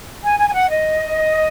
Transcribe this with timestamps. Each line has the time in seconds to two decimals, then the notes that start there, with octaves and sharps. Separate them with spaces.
0.22 G#5
0.38 G#5
0.49 G#5
0.54 F#5
0.69 D#5